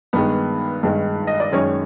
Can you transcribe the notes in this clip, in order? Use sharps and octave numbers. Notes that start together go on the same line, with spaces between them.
G2 D#3 G#3 B3 B4
G2 D#3 G#3
D#5
D5
F#2 D#3 G#3 C#4 C#5